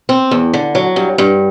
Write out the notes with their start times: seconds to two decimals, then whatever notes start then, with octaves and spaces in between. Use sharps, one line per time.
0.09 C4
0.31 E2
0.54 D3
0.75 F#3
0.96 G2
1.18 G2